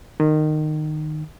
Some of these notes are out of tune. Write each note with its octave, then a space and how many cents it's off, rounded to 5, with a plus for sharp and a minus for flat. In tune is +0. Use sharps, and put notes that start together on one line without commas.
D#3 -20